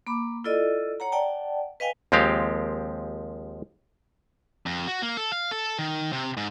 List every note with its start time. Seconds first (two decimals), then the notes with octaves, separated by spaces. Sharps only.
0.07 A#3 B5 D6
0.44 E4 F4 A4 D5 D#5
1.00 C#5 F#5 A#5
1.12 D5 F#5 G5 A5
1.80 B4 D#5 F5 G5 G#5
2.12 D#2 F3 G#3 C4 G4 F5
4.66 F2
4.87 F#4
5.02 A#3
5.17 A4
5.32 F5
5.51 A4
5.79 D#3
6.13 C3
6.37 G#2